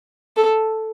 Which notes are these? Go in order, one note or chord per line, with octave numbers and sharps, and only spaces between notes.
A4